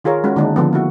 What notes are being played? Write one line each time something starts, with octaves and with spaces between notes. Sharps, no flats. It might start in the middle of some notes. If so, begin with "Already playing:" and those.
D#3 F4 G#4 A#4 C#5
G#3 C#4 F#4
D3 D#3 G#3 A#3 D4 D#4
D3 F3 B3
A#3 E4 F#4